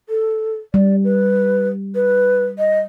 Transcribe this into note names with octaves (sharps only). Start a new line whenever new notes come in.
A4
G3 D5
B4
B4
D#5